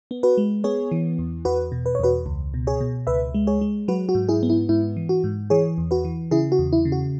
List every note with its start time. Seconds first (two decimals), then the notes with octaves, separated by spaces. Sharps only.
0.11 B3
0.23 F#4 B4
0.38 G#3
0.64 B3 G#4 C#5
0.92 E3
1.19 E2
1.45 E2 F#4 B4
1.72 B2
1.86 B4
1.95 C#5
1.99 E2 F#4 B4
2.26 C#2
2.54 B2
2.67 G#4 C#5
2.81 B2
3.07 C#2 B4 E5
3.34 G#3
3.47 G#4 C#5
3.61 G#3
3.88 F#3 F#4 B4
4.09 F#4
4.15 G#2
4.29 E4 G#4
4.43 B3
4.50 E4
4.69 G#2 E4
4.97 E3
5.09 F#4
5.24 G#2
5.50 E3 G#4 C#5
5.78 E2
5.91 F#4 B4
6.05 E3
6.31 C#3 E4 G#4
6.52 F#4
6.59 E2
6.73 E4
6.85 C#3
6.92 F#4